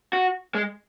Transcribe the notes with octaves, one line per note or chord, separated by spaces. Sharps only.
F#4
G#3